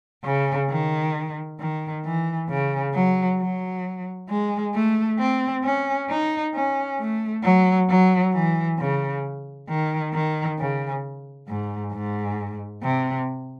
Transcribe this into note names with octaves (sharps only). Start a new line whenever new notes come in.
C#3
D#3
D#3
E3
C#3
F#3
F#3
G#3
A3
C4
C#4
D#4
C#4
A3
F#3
F#3
E3
C#3
D#3
D#3
C#3
G#2
G#2
C3